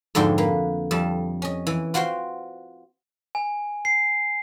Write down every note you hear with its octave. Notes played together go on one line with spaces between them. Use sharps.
F2 G#2 D3 D4 F#4 G5
A#3 B4
F2 G3 A5
C#4 D#5
E3
F4 F#4 C5 F#5 G5
G#5
C7